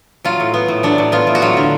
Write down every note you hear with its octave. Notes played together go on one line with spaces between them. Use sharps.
F#3 F4
A2
B3
A2
F#3 D4
A2
B3 F4
A2
F#4
F#3 F4
D3